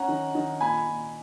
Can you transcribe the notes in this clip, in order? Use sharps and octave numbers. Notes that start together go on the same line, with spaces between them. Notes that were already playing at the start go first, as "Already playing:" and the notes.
Already playing: C#4 F#5 A#5
D#3
D#3
A#2 G#5 B5
A#2